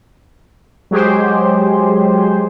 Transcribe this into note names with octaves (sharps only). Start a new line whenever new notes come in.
F#3 G#3 G4 G#4 C5